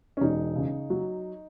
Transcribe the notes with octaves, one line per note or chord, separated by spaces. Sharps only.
C#4
E1 D#4
C#3
F#3